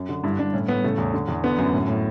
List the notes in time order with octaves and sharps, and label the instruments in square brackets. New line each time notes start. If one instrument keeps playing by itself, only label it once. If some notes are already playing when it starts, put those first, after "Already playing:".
Already playing: [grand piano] F#2
D3
G2 E4
G2 D4
A2 C#4
A2 B3
C#3 A3
E2
D3
E2
D3 B3
F#2
A2
A2